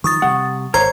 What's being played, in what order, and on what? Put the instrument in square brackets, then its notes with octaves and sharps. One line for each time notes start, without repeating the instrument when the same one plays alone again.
[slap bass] D#3 F3 [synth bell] C#6 D#6 A6
[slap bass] C3 G3 [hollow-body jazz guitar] F#5
[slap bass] G#1 [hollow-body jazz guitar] A#4 C5 C#5 [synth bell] A#5 G#6